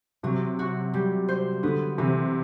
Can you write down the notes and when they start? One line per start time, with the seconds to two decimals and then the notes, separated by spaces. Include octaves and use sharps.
0.23 C3 F#3
0.59 F#4
0.94 G3
1.28 C5
1.63 D3 B3
1.98 C3 E3